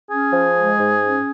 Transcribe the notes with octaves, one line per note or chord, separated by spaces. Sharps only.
C#4 G#4
F3
G#3
G#2
C#4